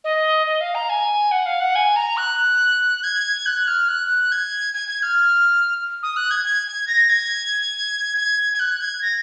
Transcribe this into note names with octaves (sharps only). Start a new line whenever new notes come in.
D#5
D#5
F5
A#5
G#5
F#5
F5
F#5
G#5
A#5
F#6
G#6
F#6
F6
F#6
G#6
G#6
G#6
F6
D#6
F#6
G#6
G#6
G#6
A#6
G#6
G#6
G#6
F#6
G#6
A#6